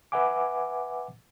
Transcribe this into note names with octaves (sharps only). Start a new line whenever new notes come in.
B4 E5 F#5 G#5 D6